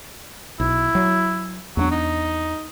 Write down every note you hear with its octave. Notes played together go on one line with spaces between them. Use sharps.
B1 E4
F#3
E2 F#3 A3 D4
D#4